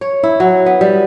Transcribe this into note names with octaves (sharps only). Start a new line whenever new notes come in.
C#5
E4
F#3
B3
G3